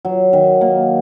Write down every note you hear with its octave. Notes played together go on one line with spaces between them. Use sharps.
F#3
D#3
A#3